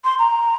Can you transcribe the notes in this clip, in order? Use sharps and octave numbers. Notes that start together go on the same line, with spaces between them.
C6
A#5